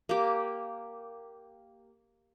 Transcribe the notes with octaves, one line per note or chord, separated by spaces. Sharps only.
A#3 G4